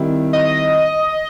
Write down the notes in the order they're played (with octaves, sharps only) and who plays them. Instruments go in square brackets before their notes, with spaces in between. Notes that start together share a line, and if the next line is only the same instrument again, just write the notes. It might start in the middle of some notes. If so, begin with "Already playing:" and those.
Already playing: [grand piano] D#3 G3 C4 E4
[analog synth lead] D#5